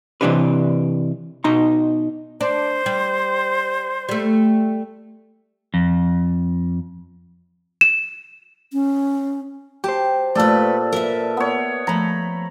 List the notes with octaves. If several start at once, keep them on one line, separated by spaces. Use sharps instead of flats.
C3 D#3 E3 D4 G4 B4
B2 D#4 A#5
D4 C5
G3
G3 A3
F2
E7
C#4
G4 C5 A5
A#2 A3 A4 B4 D5
A#4 B4 E5
B3 C#5
F3 A3 A#5 B5